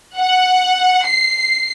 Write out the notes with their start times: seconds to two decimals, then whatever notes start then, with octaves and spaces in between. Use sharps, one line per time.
0.17 F#5
1.06 C7